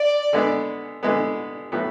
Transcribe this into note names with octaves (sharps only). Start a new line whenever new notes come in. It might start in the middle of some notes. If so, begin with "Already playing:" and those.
Already playing: D5
D3 G#3 B3
D3 G#3 B3
A2 F#3 B3